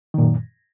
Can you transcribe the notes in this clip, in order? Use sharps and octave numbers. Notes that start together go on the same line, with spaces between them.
F#2 A#2 D#3